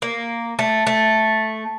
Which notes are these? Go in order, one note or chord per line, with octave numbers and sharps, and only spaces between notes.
A#3
A3
A3